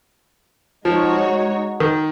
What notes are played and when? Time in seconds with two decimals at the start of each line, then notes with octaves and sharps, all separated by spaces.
0.85 F3 G#3 D#4 F#4 C#5
1.80 D#3